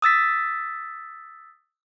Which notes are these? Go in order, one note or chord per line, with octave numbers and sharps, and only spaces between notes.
D#6 E6 A6 B6